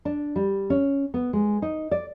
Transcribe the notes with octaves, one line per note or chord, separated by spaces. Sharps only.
D4
G3
C#4
B3
G#3
D#4
D5